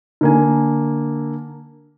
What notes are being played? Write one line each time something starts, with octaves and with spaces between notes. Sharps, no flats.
D3 A#3 G#5